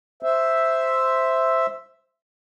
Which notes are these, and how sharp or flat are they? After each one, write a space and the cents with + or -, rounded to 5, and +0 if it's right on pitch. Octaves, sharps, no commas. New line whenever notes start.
C5 +0 E5 +0